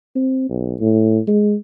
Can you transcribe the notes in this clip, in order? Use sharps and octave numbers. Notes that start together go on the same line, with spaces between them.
C4
B1
A2
G#3